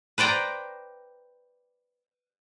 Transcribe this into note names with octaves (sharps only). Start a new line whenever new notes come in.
B4 C5 D5 G5 A#5